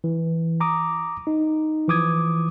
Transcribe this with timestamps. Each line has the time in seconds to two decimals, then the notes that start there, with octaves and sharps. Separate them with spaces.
0.04 E3
0.60 A#5 D6 D#6
1.27 D#4
1.88 E3 F3 D6 D#6 G#6